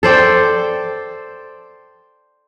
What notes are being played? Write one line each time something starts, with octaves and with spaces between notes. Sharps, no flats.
A4 C5 D5 G5